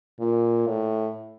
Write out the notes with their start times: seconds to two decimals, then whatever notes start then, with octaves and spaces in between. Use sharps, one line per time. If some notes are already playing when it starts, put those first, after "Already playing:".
0.20 A#2
0.67 A2